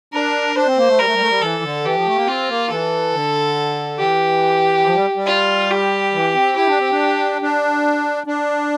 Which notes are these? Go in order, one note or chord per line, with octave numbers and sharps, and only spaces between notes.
D4 A#4
D4 C5
C4
A#3
A3
G3 A#4
A3
G3
A3
G3
E3 A4
D3
E3 G4
F3
A3
A#3
C4 F4
A#3
E3 A4
D3
E3 G4
F3
G3
G3
F4
G4
E3
C4
E4 G4
D4
C4
D4
D4
D4